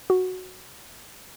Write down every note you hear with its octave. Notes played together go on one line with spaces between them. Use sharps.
F#4